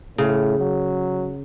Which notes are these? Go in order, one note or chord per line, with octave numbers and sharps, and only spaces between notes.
A2 C#3
F#3